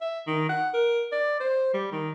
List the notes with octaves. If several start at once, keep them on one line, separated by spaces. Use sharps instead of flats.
E5
D#3
F#5
A#4
D5
C5
G3
D#3